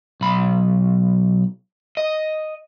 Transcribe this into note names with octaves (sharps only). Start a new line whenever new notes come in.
B1 B5
D#5